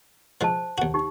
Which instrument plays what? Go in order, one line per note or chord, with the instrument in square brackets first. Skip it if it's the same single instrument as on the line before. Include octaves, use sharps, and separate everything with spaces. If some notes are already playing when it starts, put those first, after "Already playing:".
[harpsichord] F3 G#3 [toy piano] C5 A5
[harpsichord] D#2 F#4
[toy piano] D#4 G4